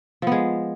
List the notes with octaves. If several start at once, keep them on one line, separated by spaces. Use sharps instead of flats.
F3 G#3 B3